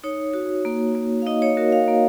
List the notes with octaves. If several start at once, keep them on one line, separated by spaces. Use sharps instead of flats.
D#4 C#5
F#4
A#3
A#3
F5
D#4 D#5
C#5
F#4 A#4
F5
A#3